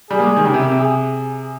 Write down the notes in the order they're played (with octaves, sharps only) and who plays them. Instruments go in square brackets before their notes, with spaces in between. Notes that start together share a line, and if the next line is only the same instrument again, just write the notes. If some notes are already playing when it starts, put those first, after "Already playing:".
[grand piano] G3 [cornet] G#4
[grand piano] A#3
G#3
D#3
[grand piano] C#3 [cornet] G4
[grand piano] C3
C3
[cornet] G#4